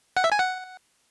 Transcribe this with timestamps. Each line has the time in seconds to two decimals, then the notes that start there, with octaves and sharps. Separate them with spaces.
0.17 F#5
0.24 E5
0.32 G#5
0.39 F#5